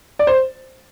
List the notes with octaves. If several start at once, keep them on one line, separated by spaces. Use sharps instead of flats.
D5
C5